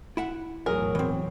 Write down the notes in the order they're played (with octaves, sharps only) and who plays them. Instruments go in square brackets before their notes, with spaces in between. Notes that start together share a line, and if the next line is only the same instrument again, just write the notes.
[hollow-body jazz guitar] E4 E5 F#5
[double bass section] B1 E2 A2 [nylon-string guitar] F#3 G#4 [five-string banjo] A#4
[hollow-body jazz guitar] E3 C4